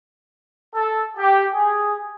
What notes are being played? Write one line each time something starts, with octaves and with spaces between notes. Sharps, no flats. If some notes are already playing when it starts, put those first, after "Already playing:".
A4
G4
G#4